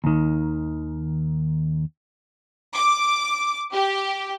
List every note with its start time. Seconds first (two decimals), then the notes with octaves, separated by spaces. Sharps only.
0.04 D#2 D#3
2.75 D6
3.72 G4